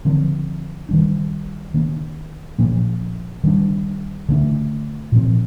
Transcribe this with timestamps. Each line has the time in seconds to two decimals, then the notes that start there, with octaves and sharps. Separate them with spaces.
0.05 D3 F3 C4
0.89 D#3 G3 D4
1.74 D#3 A#3 D4
2.59 A#2 F3 A#3 D4
3.44 D#3 G3 D4
4.29 D3 A3 D4
5.12 A#2 F3 C4